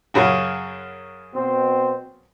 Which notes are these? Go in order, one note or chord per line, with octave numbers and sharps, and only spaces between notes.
F#2 C#3 F#4
B2 C4